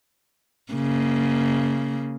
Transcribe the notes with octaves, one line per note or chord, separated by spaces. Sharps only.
C#3 A#3